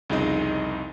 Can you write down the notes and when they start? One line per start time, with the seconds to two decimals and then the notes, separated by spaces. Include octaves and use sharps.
0.10 C2 F2 C#3 D#4 D#5 D#6